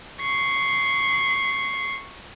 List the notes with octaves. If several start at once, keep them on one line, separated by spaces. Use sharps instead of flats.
C#6 C7